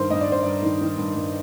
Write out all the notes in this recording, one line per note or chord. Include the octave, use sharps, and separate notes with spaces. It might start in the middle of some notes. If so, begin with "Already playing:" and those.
Already playing: G2 D#3 A#4 C5
G2 D#5
D5
G2 C5
G2 D5
D#3
D#3
G2
G2